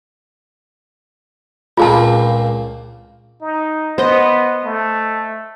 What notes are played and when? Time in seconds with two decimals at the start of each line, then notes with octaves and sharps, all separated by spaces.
1.78 C#2 A#2 C4 F4 G#4 A5
3.42 D#4
3.98 B3 C5 D#5
4.65 A3